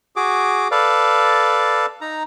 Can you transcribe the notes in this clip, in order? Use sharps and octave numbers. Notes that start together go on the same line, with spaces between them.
F#4 G#4 D6
A4 B4 D5 F5
D#4 A#5